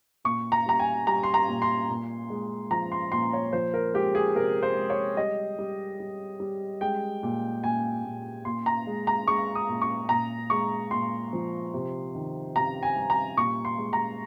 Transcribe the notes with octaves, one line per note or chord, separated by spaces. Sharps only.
A#2 C#6
A#5
G3 A#5
G#5
G3 A#5
C6
A#5
A#2
C6
A#2
G#3
F3 A#5
C6
A#2 C6
C#5
F3 C5
A#4
G#3 G4
G#4
C3 A#4
C5
G#3
C#5
G3 D#5
G3
G3
G3
G#3 G5
A#2
A#2 G#5
A#2
A#2 C6
A#5
G#3
A#5
G#3 C#6
D#6
A#2
C#6
A#2 A#5
G#3 C#6
A#2 C6
F3
C3
D#3
C3 A#5
G#5
G3
A#5
A#2 C#6
C6
G#3
A#5